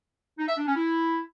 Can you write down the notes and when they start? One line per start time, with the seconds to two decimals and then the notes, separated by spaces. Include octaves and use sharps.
0.39 D#4
0.48 E5
0.57 D4
0.67 C#4
0.76 E4